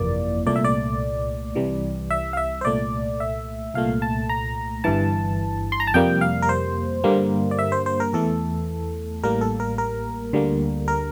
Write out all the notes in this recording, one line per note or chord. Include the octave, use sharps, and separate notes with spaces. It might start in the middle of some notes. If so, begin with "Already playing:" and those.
Already playing: G1 F2 C3 E3 A#3 D5
C2 A#2 A3 D5
E5
D5
C2 C3 E3 G3
E5
F5
E5
C5
C2 A#2 A3 D5
E5
C2 A#2 A3 F5
A5
A#5
G1 G2 E3 A5
C6
A#5
A5
F2 C3 G3 A#3 G5
F5
A#4
C5
G2 D3 G3 A#3
D5
E5
C5
C5
A#4
E2 E3 A3 A4
A1 A2 G3 A#3 A#4
A4
A#4
A#4
D2 D3 G3 A#3
A#4